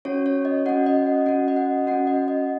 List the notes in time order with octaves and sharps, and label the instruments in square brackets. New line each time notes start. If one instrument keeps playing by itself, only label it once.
[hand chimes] C#4 F#4 C#5
C#5
D#5
C#4 F#4 F#5
D#5
F#5
C#4 F#4 F#5
D#5
F#5
C#4 F#4 F#5
D#5
D#5